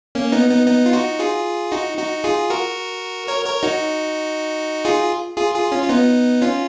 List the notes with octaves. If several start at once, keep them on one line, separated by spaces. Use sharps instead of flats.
A#3 C#4
B3 D#4
B3 D#4
B3 D#4
F4
D#4 F#4
F4 G#4
D#4 F#4
D#4 F#4
F4 G#4
F#4 A#4
A#4 C#5
A#4 C#5
D#4 F#4
F4 G#4
F4 G#4
F4 G#4
C#4 F4
F4
B3 D#4
C#4 F4